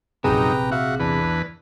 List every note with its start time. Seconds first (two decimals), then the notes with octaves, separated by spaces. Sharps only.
0.24 A#1 F#2 C3 D#4 G#4 B4 G5 A#5
0.71 F#4 E5 F5
1.00 E2 D4 B4